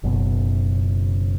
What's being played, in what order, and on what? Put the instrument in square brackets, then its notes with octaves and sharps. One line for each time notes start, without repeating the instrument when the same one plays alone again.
[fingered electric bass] F#1 F#2 B2